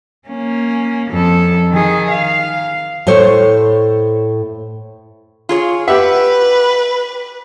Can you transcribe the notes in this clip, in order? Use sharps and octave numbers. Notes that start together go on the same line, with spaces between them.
A#3 C#4
F2 A4
D#3 G#4
F5
A2 A4 C5 C#5
F4 G#4 C#5
G4 B4 E5 F#5